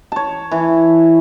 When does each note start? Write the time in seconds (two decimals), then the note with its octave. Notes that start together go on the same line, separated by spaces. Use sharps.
0.12 C#5 A5
0.51 E3